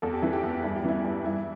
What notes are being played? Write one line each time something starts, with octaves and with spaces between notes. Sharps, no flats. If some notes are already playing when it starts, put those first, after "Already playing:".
E2 A4
G4
E3 E4
G4
E2
G2 E4
G4
E3 E4
G2
G2 E4